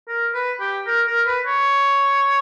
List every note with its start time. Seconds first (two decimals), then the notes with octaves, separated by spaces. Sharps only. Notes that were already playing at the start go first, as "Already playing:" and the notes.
0.08 A#4
0.34 B4
0.60 G4
0.87 A#4
1.07 A#4
1.26 B4
1.46 C#5